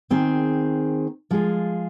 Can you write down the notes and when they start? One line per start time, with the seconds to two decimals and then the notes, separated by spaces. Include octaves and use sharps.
0.10 D#3 C4 G#4
1.31 F3 G#3 F4 G#4